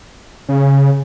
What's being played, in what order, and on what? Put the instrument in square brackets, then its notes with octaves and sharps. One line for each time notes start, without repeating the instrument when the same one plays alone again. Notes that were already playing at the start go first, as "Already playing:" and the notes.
[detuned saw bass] C#3